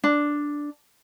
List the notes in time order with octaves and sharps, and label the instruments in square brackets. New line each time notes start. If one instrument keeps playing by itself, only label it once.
[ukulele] D4